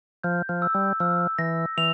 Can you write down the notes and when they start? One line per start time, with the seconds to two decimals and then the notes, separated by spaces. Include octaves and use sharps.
0.24 F3 G6
0.49 F3
0.62 E6
0.75 G3
1.00 F3 E6
1.38 E3 A#6
1.77 E3 F7